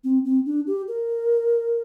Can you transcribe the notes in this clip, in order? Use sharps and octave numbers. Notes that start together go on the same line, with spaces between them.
C4
C4
D4
G4
A#4